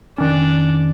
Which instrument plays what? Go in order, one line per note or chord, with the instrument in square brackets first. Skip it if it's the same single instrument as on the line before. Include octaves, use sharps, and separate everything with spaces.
[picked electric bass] F1 D#3 C#4 [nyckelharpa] D4